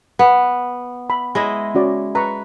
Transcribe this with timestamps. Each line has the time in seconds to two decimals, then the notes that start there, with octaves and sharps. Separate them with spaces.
0.19 B3
1.10 B5
1.35 G#3 E4 D#5
1.75 C#4 F#4 D5
2.15 B4 A#5 C#6